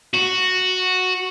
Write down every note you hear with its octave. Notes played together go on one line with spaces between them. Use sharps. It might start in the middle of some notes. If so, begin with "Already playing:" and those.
F#4